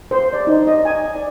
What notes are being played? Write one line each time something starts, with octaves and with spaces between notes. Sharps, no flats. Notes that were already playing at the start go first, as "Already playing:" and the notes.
C5
D5
D#4
D#5
G#5
D5